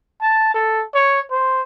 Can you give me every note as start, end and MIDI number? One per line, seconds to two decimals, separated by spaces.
0.21 0.54 81
0.54 0.83 69
0.95 1.20 73
1.31 1.62 72